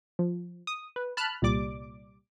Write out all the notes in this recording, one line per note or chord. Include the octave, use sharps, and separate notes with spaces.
F3
D#6
B4
A5 B5 F6 F#6
C2 A#2 G3 D5 D6